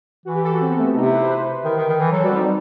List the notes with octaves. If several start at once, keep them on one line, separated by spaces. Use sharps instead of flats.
E3 F#4
G4
A4
F#4
C4
B3
A3
B3
C3 D#4
E4
B4
C5
B4
D#3
D#3
D#3
E3
F#3 A4
G3 F#4
C4
G3 D#4